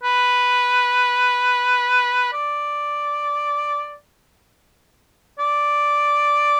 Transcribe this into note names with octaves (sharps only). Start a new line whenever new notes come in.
B4
D5
D5